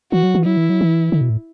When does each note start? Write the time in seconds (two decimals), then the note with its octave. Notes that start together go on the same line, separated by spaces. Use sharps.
0.12 E3 F#4
0.23 F#3
0.35 E3
0.45 F#3 E4
0.57 E3
0.70 F#3
0.81 E3
1.12 D3
1.21 B2
1.30 A2